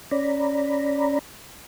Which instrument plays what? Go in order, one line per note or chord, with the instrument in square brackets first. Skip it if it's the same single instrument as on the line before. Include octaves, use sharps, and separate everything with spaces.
[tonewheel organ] C#4 D5 A#5 B5